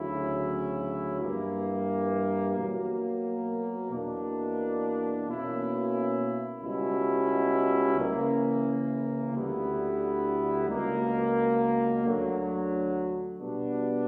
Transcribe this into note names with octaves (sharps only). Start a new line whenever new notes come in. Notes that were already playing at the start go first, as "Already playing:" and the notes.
Already playing: D2 C#3 F#3 C#4 E4
G2 E3 G3 A#3
B2 F#3 A#3
E2 B2 A#3 D4
B2 A#3 C#4 E4
C#2 B2 G3 C#4 E4
C#3 E3 A#3 E4
D2 D3 G3 B3 E4
C#2 B2 A#3
D2 D3 F#3
B2 G3 B3 D4